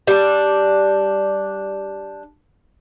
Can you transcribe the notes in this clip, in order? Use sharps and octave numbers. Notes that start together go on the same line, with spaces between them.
G3 D4